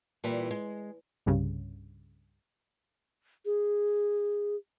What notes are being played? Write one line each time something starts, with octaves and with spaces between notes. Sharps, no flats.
A#2 E3 G3
G#3
C2 G2 C#3
G#4